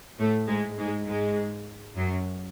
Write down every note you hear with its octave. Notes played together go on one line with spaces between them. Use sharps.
A2 A3
G#2 G#3
G#2 G#3
G#2 G#3
F#2 F#3